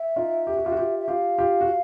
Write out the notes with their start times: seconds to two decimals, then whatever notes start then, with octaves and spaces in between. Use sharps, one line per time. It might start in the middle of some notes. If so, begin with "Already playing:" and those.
Already playing: E5
0.16 D#4 F4
0.47 G4
0.57 F#4
0.65 F4 G4
0.72 F#4
0.77 F4 G4
0.99 E5
1.08 F4 G4 F5
1.38 F4 G4
1.61 F#4